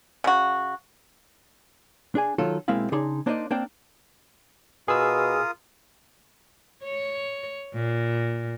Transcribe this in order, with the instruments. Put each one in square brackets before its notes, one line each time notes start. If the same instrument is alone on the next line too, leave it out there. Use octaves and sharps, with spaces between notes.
[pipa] C#3 F#4
[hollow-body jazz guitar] D4 G#4 G#5
D#3 F#3 F4 A4
B1 G#3 A#3 C4 E4 F5
C#3 D4 D#4 G#4 C6
A#3 D4 D#4 C5 D5 D#5
A#3 C4 D4 D5 G5
[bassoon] B2 [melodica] F4 A#4 D#6 [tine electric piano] G#4 E6
[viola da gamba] C#5
A#2